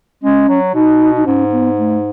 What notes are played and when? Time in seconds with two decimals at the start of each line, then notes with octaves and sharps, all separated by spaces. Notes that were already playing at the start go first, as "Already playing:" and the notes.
0.23 G#3 C#4
0.49 F#3
0.74 B2 D#4
1.17 D#4
1.26 G#2 C#4
1.52 B3
1.78 A3